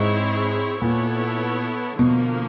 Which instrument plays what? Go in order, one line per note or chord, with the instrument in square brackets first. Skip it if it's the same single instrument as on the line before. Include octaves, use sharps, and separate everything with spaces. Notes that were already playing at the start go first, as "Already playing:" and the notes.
Already playing: [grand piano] G#2 [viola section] C4 E4 G#4 C#5
[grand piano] A#2 [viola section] B3 E4 A4 C#5
[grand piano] B2 [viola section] D3 F3 A#3